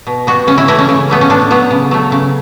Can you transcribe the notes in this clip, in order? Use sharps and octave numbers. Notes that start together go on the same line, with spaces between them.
B2
G3 B3 F#4
C#3 C#4
E4
E3 A3 E4
C#4
C#3
E3 A3 B3
C#4
A2 D4
F#3 B3
C#3
F#3 A3
C#3